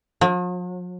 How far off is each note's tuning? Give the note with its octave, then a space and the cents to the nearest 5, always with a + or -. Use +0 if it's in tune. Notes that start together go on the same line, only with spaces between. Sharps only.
F3 +45